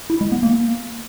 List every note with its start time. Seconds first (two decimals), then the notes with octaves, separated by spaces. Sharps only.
0.10 E4
0.21 G#3
0.32 B3
0.43 A#3